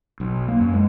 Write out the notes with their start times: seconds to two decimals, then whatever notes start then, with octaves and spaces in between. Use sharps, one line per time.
0.20 B1
0.48 A#3
0.60 F#2
0.74 G#3